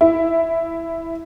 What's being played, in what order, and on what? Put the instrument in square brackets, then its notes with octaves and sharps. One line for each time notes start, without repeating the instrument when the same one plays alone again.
[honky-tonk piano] E4